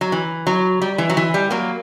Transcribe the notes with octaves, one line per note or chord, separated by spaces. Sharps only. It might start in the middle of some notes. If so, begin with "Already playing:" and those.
F#3
E3
F#3
G3
E3
F#3
E3
G3
F#3 A#3